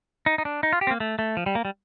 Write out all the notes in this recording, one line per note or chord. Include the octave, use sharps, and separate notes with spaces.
D#4
D#4
D4
D#4
F4
G4
C4
A#3
A3
A3
F3
G3
A#3
G3